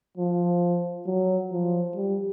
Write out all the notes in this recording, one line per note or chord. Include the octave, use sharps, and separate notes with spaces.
F3
F#3
F3
G3